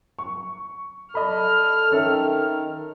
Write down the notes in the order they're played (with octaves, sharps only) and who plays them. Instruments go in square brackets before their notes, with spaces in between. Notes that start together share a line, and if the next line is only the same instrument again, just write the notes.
[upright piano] C#6
[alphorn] A4 [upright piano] D5 D#5 B5 [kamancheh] F6
[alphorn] D#3 [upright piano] C#4 A4 E5